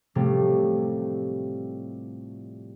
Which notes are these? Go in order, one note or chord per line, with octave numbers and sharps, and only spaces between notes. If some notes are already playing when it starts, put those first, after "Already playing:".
A2 C3 F3 G3 A3